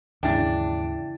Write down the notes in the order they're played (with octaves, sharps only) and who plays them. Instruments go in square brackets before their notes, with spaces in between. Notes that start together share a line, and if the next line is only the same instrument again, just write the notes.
[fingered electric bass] D#2 G#2 [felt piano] C#3 E3 A6 [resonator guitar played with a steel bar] D4 [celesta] E5 G5